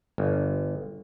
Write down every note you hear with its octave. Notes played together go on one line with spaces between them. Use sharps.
G1